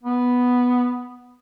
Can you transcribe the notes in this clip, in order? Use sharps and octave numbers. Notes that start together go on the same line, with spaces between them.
B3